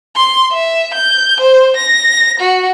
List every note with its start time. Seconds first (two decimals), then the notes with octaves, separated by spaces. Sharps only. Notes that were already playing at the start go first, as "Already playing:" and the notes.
0.16 C6
0.52 E5
0.94 G6
1.40 C5
1.77 A#6
2.40 F#4